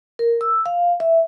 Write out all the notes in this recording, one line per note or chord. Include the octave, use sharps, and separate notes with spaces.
A#4
E6
F5
E5